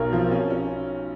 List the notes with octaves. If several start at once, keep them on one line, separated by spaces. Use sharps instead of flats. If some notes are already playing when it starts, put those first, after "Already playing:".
Already playing: B1 F#4 A#4
F3
C#4
C#4